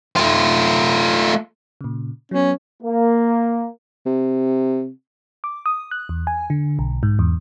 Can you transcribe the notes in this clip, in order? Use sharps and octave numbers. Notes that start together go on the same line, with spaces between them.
A3 F4
A#2 C#3
F#3 B3 C#4
A#3
C3
D6
D#6
F#6
E2
G#5
D3
B1
G#2
E2